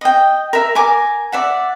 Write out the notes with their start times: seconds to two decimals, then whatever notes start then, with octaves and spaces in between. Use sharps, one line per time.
0.01 D#5 G5
0.53 A#4 E5
0.75 A#4 G#5 D6
1.32 D5 E5 F#5